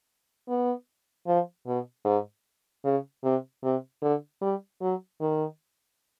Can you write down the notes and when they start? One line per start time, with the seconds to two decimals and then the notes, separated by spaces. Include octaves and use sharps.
0.48 B3
1.27 F3
1.66 B2
2.05 G#2
2.84 C#3
3.23 C3
3.63 C3
4.02 D3
4.41 G3
4.81 F#3
5.21 D#3